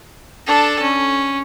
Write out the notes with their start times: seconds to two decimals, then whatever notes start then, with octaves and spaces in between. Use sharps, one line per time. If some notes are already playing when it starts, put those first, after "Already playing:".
0.47 D4 A4
0.82 C#4